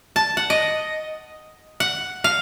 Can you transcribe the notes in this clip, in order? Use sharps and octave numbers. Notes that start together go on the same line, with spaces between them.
A5
F#5
D#5
F#5
F5